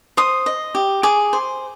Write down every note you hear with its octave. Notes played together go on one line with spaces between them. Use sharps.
C5 D#6
D#5
G4
G#4 D6
C5